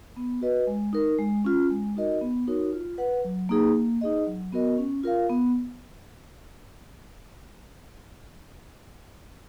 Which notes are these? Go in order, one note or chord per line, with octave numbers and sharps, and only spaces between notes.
B3
F#4 B4 D#5
G#3
D#4 A#4
G#3
C#4 F4
G#3
D#4 F#4 A#4 D#5
B3
D#4 F#4 A#4 C#5
F4
B4 F#5
F#3
A#3 D#4 G#4
A#3
D#4 G#4 D#5
F#3
B3 F#4 A#4 D#5
C#4
F4 A#4 F5
B3